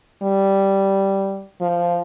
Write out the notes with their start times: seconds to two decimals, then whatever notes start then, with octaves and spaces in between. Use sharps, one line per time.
0.23 G3
1.61 F3